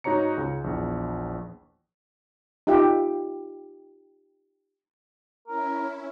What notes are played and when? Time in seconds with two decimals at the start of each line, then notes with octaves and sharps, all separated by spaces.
0.04 G#2 D#4 F#4 C#5 A#5 C#7
0.37 C#2
0.64 A#1 E2
2.67 D#4 F4 G4 E5
5.47 C#4 E4 A#4